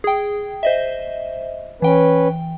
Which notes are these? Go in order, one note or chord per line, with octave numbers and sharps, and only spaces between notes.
G#4 G5
C5 D#5 E5
E3 C#4 B4 G5